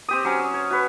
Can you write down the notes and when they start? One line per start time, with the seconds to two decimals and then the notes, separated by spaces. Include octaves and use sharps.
0.09 C4 G4 D#6
0.25 F#3 C#4
0.39 D#6
0.54 C#5
0.71 F#4 B4